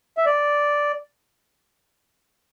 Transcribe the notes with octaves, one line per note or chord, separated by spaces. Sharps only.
E5
D5